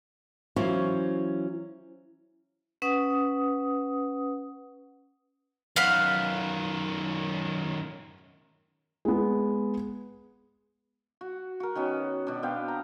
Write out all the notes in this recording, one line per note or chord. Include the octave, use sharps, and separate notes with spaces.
E3 F#3 C#4 E4 F4 C5
C#4 B4 F#5 D#6
F#2 D#3 F5 F#5 B5
G#3 B3
F#4
F#4 A#4
D#3 B3 C#4 F#4
B2 D4
B3 C4 F5 G5
A#5